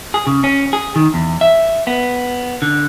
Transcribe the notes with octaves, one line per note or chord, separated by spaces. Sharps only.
G#4
C#3
C#4
G#4
D#3
E2
E5
B3
D3